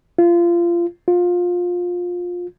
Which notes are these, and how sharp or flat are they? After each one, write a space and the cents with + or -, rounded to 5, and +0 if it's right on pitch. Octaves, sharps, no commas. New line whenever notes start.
F4 -25
F4 +20